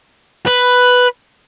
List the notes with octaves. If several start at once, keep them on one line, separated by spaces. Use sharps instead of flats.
B4